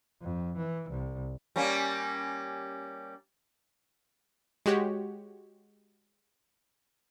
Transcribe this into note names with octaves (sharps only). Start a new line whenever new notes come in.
F2
E3
C2
G3 A#3 C#4
G#3 F#4 G4 C#5